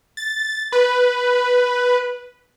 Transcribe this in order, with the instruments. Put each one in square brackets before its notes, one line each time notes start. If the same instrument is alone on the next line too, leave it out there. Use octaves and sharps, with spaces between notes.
[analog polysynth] A6
B4